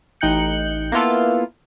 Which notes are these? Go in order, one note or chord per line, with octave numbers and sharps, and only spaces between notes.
A1 D#4 G5 F#6 G6 C#7
A#3 B3 E4 F4 A4